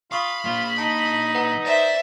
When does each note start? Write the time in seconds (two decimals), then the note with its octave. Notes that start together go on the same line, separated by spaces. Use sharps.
0.12 F4 F5 B5 C#6 D#6
0.45 F3 A#3 F4
0.78 D#4 A5
1.35 B4 F#5 A#5
1.65 C5 D5 E5